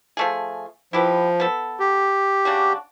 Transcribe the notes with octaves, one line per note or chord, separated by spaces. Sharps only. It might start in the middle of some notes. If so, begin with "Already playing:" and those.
F3 A3 G#4
F3 E4 G4 B4
B3 A4
G4
C#3 D4 F#4